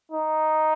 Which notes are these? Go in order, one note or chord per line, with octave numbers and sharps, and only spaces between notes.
D#4